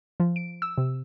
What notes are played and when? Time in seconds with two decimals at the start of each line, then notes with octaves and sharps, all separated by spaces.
0.20 F3
0.36 D7
0.62 E6
0.78 C3